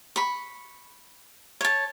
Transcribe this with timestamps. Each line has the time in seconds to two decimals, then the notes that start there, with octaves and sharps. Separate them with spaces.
0.16 B5 C#6
1.61 C#5 A5